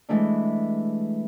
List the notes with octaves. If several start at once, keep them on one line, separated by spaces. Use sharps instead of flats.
E3 G#3 A3 D4